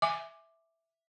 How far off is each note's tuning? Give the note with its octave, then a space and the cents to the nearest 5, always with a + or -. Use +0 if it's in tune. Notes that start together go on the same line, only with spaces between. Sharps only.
E5 +0 G#5 +0 D6 +10